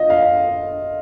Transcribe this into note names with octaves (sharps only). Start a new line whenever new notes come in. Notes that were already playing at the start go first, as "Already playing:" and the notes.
Already playing: F4 D#5
F5